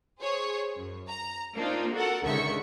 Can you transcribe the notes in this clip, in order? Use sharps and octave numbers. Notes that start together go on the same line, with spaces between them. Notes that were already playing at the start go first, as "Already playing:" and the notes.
G#4 C5 C#5
F#2
A#5
A#3 C4 D4 D#4 F4
F#4 A4 A#4 F#5
C#2 D3 D#3 E5 C#6 C#7